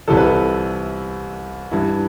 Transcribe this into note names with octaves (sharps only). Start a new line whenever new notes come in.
C2 C3 E3 A4
B4
A4
G2 E3 E4